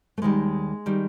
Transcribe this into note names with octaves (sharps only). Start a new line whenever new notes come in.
A3
D#2 D#3 G3 G#3
D#3 G3